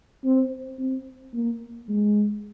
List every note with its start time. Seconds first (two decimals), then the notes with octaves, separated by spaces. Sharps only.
0.24 C4
0.79 C4
1.33 A#3
1.88 G#3